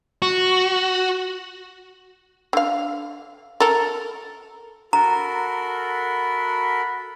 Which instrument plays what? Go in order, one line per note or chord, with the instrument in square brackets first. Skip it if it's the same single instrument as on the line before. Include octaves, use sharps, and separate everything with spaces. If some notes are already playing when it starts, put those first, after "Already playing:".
[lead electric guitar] F#4
[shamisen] D3 F5
A4 A#4
[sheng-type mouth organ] F#4 A4 A#4 [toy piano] A#5 [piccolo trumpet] B5